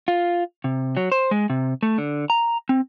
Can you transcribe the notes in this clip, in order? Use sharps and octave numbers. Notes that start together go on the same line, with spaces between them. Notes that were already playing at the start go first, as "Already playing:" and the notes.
F4
C3
F#3
C5
G#3
C3
A3
D3
A#5
C4